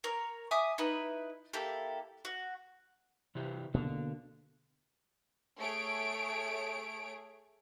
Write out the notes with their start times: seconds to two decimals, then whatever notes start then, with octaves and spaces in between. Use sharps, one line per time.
0.04 A#4 C#5
0.51 E5 G#5 D6 D#6
0.78 D#4 E4 B4
1.53 A#3 E4 G4 A4
2.25 F#4
3.35 C3 E3 G4
3.74 B2 D3 A#3
5.59 A3 G#4 C#5 D7